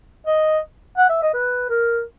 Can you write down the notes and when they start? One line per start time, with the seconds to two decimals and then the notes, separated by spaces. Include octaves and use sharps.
0.26 D#5
0.97 F#5
1.09 E5
1.22 D#5
1.34 B4
1.69 A#4